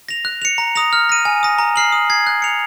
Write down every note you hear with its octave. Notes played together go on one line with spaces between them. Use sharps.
A#6 F7
F#6
C#7 F7
A#5
D#6 A#6 F7
F6
A#6 D#7
G#5
D#6 A#6
A#5
F6 C7 F#7
D#6
G#6 C7
F#6
C#7 F7